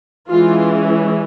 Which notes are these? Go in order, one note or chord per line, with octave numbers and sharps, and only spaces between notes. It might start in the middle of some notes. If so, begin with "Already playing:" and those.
E3 G#3 C#4 F4